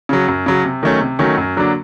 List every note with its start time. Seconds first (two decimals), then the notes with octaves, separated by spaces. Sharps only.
0.09 C#3 F#3
0.28 F#2
0.46 C#3 F#3
0.65 C3
0.83 D#3 F#3 A3 C#4
1.01 C3
1.19 D#3 F#3 A3 C#4
1.37 F#2
1.56 D3 F#3 A#3 D4